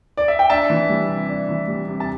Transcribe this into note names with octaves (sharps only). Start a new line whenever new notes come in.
D5
E5
G5
D4 E5 A5
E3
G3
C3
D4
E3
G3
C3
A5